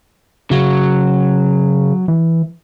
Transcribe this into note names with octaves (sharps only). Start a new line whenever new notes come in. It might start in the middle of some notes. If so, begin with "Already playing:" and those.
C#3 F#3
E3